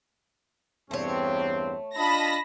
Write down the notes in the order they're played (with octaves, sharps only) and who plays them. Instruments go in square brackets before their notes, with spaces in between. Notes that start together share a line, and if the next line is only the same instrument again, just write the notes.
[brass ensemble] E2 G2 C4 [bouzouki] A3 C#5
[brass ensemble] D4 F4 D#5 [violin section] A5 B5 A#6